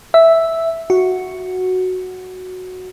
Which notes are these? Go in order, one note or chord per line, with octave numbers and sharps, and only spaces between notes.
E5
F#4